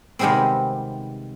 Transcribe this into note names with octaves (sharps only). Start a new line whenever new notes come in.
C3 D#3 G3 G#3 B3 C4